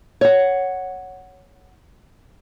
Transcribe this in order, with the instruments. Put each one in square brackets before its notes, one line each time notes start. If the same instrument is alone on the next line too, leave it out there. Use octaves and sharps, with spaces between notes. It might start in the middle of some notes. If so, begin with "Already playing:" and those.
[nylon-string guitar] C#5 F#5